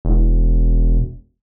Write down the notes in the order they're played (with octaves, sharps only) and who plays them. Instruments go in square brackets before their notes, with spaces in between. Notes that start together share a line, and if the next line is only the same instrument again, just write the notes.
[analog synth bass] E1